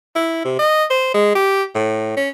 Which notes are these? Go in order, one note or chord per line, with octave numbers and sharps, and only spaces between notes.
E4
C3
D#5
C5
G#3
G4
A2
C#4